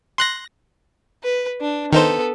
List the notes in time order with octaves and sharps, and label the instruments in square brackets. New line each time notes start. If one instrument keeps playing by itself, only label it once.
[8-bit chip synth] C6 F#6 A#6
[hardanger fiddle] B4
D4
[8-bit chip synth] D#3 D#4 C5 [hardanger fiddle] B3 A4